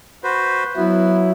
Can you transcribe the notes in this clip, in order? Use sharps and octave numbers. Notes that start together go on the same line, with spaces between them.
F#4 B4 C5
F#3 B3 E4